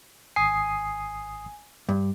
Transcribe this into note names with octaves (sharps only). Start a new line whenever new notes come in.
G#1 G#5 D#6 C7
G2